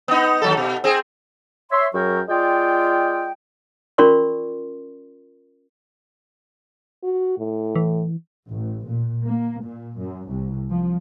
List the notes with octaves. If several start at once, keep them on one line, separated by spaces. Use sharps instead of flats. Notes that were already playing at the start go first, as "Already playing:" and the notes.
B3 D#4
D#2 F#3 A4
B2
C4 G#4
C#5 E5 C6
F#2 F#3 G#4 A#4 G5 C#6
G#3 F4 D5 D#5 G5
C#4 F4 A#4 D5 C6 C#6
F#4
A2
E3
A1
A#2
A#3
A#2
F#2
C2
F3